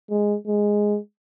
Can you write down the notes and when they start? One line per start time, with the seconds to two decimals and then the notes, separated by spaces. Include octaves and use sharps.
0.10 G#3
0.47 G#3